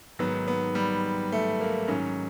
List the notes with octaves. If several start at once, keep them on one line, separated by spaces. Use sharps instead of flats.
G#2 D#3 F#3 B3
B3
G3
A3
A#3
G#2 D#3 F#3 C#4